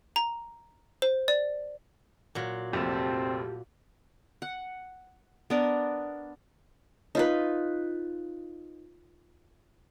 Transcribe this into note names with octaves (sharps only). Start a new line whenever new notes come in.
A#5
C5
D5
A#2 F#3
F1 A#1 C4 G4 A5
F#5
B3 D4 A#4
D#4 F4 B4